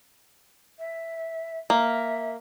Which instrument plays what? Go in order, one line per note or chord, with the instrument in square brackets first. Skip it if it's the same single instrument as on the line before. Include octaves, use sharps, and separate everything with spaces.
[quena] E5
[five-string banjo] A#3 [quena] E5